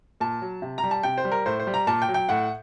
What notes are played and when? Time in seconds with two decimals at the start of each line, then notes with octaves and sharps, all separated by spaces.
0.20 A#2 A5
0.42 F#3
0.62 C3
0.78 A#5
0.84 G3
0.91 A5
1.03 C3 G5
1.18 C5
1.25 G3
1.32 A#4
1.46 A2 C5
1.60 C5
1.67 G3
1.74 A#5
1.87 A#2 A5
2.02 G5
2.09 F#3
2.14 G5
2.29 A2 F#5